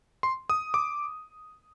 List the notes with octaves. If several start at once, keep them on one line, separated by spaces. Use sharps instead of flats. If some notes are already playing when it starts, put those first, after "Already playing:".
C6
D#6
D6